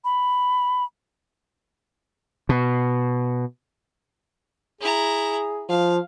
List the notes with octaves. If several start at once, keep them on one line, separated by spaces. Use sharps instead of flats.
B5
B2
E4 G#4 A#5
F3 F5